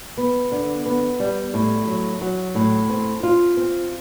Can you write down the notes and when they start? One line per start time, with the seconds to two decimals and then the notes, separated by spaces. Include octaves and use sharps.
0.18 B3
0.52 D3
0.86 B3
1.20 G3
1.54 A2
1.87 F#3
2.21 F#3
2.55 A2
2.90 C4
3.23 F4
3.57 C4